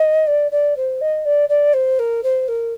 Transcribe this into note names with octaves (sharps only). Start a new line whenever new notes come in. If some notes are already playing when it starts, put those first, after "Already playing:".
Already playing: D#5
D5
D5
C5
D#5
D5
D5
C5
A#4
C5
A#4